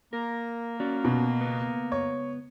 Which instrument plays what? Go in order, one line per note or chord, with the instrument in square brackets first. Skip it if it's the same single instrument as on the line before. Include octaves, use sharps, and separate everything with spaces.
[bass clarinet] A#3 [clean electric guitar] A#4
[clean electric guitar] C#4 F#4 D5
[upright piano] B2
[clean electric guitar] C#2 B3
[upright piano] C#5